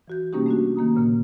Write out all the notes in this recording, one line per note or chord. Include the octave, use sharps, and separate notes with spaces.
E3 F#4 G6
C3 G3 A#3 C#4 D#4 G4
A3 D4 F#4
D#3 A#3 A#5 D#6
A#2 C#3 A#3